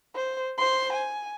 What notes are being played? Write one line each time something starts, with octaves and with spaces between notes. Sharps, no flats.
C5
C5 C6
G#5